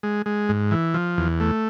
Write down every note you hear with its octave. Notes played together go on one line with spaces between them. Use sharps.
G#3
G#3
G#2
E3
F3
E2
A3